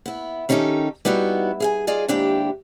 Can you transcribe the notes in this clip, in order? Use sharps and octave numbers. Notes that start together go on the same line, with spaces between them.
B3 E4
D#3 C#4 D#4 F4 G4 A4
G3 B3 D#4 E4 F#4
G#4 F5 G#5
F4 G#4 D5 D#5
D#2 G#2 D4 E4 G4 G5